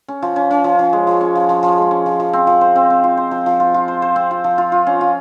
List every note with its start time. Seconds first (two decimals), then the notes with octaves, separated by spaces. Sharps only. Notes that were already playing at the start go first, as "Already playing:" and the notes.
0.08 C#4
0.22 F3
0.36 C#4
0.51 C#4
0.64 F3
0.79 F3
0.93 G#3
1.07 F3
1.21 C#4
1.35 F3
1.49 F3
1.63 F3
1.78 G#3
1.91 C#4
2.06 F3
2.20 F3
2.33 C4
2.47 F3
2.61 C5
2.76 C4
2.90 C4
3.04 F4
3.17 C5
3.31 F3
3.46 F3
3.60 F4
3.74 F4
3.88 C5
4.02 C5
4.16 C4
4.31 F4
4.44 F3
4.58 F4
4.72 F4
4.87 C#4
5.01 F4